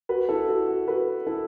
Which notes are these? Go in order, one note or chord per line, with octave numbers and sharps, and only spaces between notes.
F#4 B4
E4 A4
F#4
F#4
F#4 B4
E4 A4